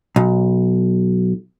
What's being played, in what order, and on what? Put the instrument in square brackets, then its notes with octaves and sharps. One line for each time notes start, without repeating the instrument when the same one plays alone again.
[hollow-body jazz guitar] B1